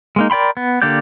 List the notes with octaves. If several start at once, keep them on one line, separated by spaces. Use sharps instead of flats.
G#3 A#3 D#4
A#4 D5 G5 B5 C6
B3
D3 A#3 G4 D5 G6